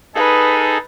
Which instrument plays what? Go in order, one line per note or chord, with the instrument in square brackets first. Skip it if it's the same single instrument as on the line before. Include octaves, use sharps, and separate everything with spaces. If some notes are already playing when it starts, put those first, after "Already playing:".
[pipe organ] D#4 G#4 A4 [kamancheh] B4